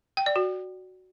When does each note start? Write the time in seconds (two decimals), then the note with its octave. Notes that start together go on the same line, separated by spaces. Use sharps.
0.17 G5
0.26 D5
0.36 F#4